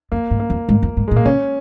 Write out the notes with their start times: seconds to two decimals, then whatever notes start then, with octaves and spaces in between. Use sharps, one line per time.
0.12 F2 A#3
0.31 G#2
0.40 A#3
0.50 F2
0.69 G#2
0.82 F2
0.97 G#2
1.08 A#2 G#3
1.16 A#3
1.25 C#3 C#4